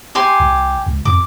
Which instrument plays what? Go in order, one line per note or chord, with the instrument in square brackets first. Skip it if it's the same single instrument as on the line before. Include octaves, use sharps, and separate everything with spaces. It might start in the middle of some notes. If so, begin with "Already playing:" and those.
[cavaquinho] G4 G#5 C6
[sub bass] C2
C#2
[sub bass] F2 [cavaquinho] D6